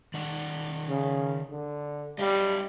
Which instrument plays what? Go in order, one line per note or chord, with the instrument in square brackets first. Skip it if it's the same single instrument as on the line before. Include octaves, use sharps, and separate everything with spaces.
[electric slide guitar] D#3 D5 F#5
[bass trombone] C#3
D3
[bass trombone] G3 [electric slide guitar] D4 D#5 F5